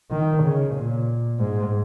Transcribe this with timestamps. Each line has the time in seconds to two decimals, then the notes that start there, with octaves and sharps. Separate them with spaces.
0.11 D#3
0.43 C#3
0.75 A#2
1.39 G#2